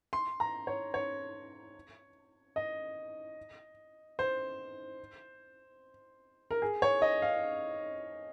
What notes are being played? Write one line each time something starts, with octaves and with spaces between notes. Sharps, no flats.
C6
A#5
C#5
C#5
D#5
C5
A#4
G#4
C#5
D#5
F5